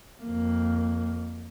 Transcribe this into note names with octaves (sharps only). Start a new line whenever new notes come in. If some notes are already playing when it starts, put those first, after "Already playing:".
F2 A#3